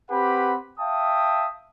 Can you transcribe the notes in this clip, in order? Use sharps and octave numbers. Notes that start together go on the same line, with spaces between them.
C4 G4 B4 F#5 B5
E5 F5 G5 A5 D#6